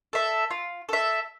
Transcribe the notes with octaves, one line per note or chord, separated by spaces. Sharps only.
A4 E5
F4
A4 E5